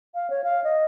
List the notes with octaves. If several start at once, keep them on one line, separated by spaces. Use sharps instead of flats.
F5
C#5
F5
D#5